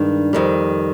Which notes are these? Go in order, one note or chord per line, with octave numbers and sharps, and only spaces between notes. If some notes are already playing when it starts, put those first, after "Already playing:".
Already playing: G2 D#3 G#3 D4
F2 D#3 G3